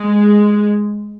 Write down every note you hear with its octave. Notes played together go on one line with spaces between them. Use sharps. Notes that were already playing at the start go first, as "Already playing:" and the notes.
Already playing: G#3